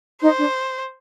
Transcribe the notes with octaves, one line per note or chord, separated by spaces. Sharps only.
D#4 C5
D4